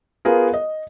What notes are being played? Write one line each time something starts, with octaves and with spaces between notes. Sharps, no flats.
B3 F4 G#4 A#4
D#5